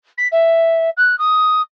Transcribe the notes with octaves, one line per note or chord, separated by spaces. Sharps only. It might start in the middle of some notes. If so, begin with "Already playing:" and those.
B6
E5
F#6
D#6